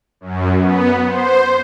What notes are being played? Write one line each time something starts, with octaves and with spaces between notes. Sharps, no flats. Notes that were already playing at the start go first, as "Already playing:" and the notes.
F#2
B3
C5